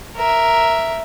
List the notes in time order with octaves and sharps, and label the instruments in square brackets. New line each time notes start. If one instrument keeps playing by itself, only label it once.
[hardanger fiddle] A#4 E5